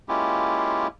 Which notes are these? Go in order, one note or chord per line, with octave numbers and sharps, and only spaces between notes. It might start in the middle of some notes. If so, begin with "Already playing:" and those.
G#3 A#3 C#4 E4 F4 G4